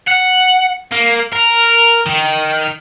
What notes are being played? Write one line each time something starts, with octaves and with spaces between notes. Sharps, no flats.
F#5
A#3
A#4
D#3